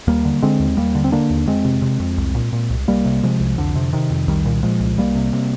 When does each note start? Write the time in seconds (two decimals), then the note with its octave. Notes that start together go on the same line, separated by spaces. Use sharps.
0.07 D#2 G3 A#3
0.25 D3
0.42 D3 G#3 C4
0.60 D#2
0.77 D#2 G3 A#3
0.95 D3
1.04 C4
1.12 D3 A#3 D4
1.30 D#2
1.47 F2 G#3 C4
1.65 C3
1.82 C3
2.00 F2
2.18 C2
2.35 A#2
2.53 A#2
2.70 C2
2.88 C2 G3 A#3
3.05 C3
3.23 C3 F3 G#3
3.40 C2
3.58 F2 D3
3.76 C3
3.93 C3 D#3
4.10 F2
4.27 C2 D#3 G3
4.45 A#2
4.63 A#2 F3 G#3
4.80 C2
4.98 C2 G3 A#3
5.15 C3
5.33 C3